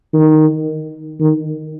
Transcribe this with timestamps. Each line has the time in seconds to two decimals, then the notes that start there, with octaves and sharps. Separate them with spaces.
0.14 D#3
1.20 D#3